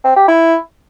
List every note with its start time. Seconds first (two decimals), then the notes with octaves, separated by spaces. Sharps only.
0.04 C4
0.16 G4
0.28 E4